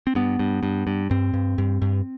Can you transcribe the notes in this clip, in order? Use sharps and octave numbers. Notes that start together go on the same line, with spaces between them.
C4
G2 B3
G2
G2
G2
G2 C4
G2
G2
G2